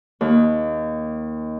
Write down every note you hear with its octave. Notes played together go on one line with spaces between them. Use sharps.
D#2